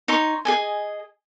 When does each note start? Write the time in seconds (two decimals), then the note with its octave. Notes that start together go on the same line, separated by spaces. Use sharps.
0.08 D#4 C#5 C6
0.45 G#4 D#5 G#5